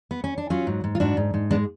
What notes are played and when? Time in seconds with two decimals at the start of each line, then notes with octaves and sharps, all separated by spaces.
0.11 B3
0.24 C#4
0.38 D4
0.50 F#3 C#4 F4
0.67 G#2
0.84 G#2
0.95 F4
1.00 G#2 D4 F#4
1.17 G#2
1.34 G#2
1.51 G#3 B3 D4